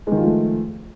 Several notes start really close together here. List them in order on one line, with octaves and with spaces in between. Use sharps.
G#3 D#3 F4 F3 A3